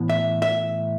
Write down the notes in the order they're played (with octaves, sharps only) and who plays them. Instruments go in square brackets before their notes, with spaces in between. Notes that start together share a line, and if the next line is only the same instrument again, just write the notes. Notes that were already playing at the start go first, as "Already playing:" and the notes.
Already playing: [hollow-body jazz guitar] A2 E3 B3
E5
E5